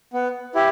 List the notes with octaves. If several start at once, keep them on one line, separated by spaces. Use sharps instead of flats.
B3
E4 G4